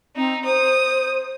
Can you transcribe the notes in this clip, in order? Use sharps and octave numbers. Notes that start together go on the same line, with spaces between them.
C4 D#4
C5 D#6